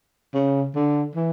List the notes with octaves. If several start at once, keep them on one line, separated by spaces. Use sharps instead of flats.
C#3
D3
E3